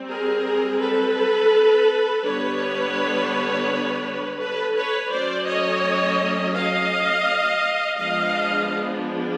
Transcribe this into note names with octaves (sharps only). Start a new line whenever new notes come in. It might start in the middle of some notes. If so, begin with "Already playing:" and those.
Already playing: G3 C4
G#4 A#4
A4 B4
D3 G3 B3 D4 B4 C#5
A4 B4
B4 C#5
F#3 A3 C#4 C5 D5
C#5 D#5
D#5 F5
F3 G#3 B3 D4 D#5 F5